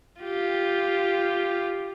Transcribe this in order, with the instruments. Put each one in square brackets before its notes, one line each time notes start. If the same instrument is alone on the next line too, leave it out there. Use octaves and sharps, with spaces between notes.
[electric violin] F4 G4